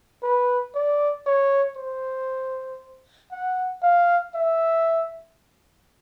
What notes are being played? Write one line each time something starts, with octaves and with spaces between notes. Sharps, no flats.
B4
D5
C#5
C5
F#5
F5
E5